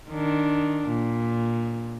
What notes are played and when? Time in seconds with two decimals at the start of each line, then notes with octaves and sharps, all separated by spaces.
0.10 D#3 D4
0.88 A#2